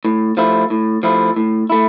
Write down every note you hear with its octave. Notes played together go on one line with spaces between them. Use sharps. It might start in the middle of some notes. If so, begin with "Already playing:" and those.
A2
F3 A3 E4
A2
F3 A3 E4
A2
A3 E4